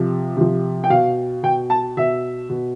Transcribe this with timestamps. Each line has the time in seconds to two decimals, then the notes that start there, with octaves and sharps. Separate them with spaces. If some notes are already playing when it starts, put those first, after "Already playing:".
Already playing: C3 F3
0.37 C3 F3
0.84 G5
0.90 B2 F5
1.43 B2 G5
1.70 A5
1.97 B2 E5
2.49 B2